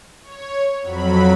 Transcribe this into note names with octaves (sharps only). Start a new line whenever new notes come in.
C#5
F2 F#3 B5